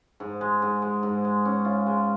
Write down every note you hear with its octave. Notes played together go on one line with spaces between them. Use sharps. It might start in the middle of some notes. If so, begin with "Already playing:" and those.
G#2
G#3
G#2
G#3
G#2
G#3
C#4
F4
G#3